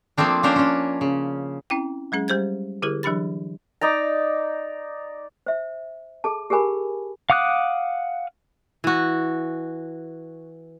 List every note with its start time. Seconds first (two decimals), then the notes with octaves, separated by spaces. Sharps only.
0.17 F3 A3 A#3 C4 D4
0.43 A#3 C#4 D4 A#4 C5
0.56 C#4 D4
1.01 C#3
1.70 C4 C#4 E4 G5
2.12 F#3 G#3 C#4 G#4
2.28 G3 G4 C5 G6 G#6
2.82 D3 E4 G4 G#4 A#4
3.03 E3 F#3 D4 G4 B5 A6
3.81 D#4 D5 A#5
5.46 C5 E5
6.24 G#4 A4 A5
6.50 G4 G#4 A#4 G#5 B5
7.30 F5 F#5 D6 D#6 F#6
8.84 E3 F#4